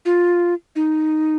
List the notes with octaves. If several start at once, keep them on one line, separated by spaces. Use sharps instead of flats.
F4
D#4